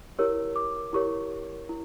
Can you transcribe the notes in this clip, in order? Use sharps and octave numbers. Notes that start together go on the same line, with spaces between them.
E4 G4 A#4 C#5 E6
D6
E4 G4 A#4 C#5 C#6
E4